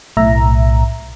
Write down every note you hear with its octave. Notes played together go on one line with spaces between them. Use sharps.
B1 A2 E5 A#5